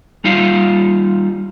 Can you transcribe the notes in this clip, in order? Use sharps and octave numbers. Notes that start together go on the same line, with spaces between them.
G3 D#4 F4 F5